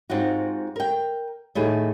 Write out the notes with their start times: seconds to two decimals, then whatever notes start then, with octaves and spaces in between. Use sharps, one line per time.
0.10 G#2 C4 F4 F#4
0.76 A#4 G5
1.55 A2 D#3 E4 G#4